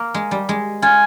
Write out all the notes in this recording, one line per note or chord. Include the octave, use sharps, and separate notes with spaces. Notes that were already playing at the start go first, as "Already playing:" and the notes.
Already playing: A#3
G#3
G3
G#3
F4 G#5